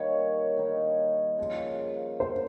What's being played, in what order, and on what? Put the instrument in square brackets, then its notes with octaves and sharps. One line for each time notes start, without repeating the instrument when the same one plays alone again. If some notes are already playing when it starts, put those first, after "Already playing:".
Already playing: [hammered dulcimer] D#3 G3 A#3 D#4 [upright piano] C#5
[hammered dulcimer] D#3 G3 A#3 D#4
C#3 F3 A#3
[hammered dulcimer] C#3 F3 A#3 [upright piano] C5